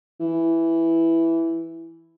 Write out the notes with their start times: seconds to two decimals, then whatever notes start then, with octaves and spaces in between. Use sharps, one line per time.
0.20 E3